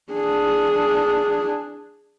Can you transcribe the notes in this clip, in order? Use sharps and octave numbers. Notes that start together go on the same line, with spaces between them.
D4 G#4